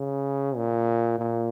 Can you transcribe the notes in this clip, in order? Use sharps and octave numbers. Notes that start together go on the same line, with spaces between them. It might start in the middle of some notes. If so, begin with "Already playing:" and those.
Already playing: C#3
A#2
A#2